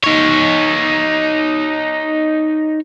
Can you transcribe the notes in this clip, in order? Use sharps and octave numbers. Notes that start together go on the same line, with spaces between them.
D#4 C#5